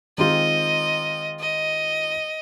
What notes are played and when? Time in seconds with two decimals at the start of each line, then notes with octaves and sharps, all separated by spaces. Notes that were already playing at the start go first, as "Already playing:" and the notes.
0.18 D#3 G#3 C4 F4 D#5
1.40 D#5